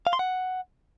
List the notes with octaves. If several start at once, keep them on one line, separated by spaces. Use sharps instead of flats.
F5
C6
F#5